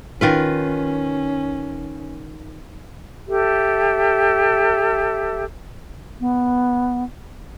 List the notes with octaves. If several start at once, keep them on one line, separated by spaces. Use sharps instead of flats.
D#3 C#4 F4 B4
G4 A4 E5
B3